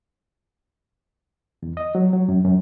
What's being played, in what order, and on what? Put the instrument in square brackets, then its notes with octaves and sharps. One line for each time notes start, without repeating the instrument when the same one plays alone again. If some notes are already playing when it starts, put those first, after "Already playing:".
[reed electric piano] E2
D#5
F#3
F#3
F#2
F#2